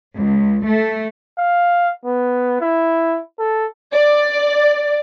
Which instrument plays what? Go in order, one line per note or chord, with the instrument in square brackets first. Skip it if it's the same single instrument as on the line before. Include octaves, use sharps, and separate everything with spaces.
[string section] C#2
A3
[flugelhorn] F5
B3
E4
A4
[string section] D5